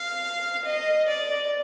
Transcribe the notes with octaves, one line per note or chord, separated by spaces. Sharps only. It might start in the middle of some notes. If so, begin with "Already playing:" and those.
Already playing: F5
D#5
D5